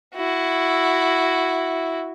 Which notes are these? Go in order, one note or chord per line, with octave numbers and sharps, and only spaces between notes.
E4 F#4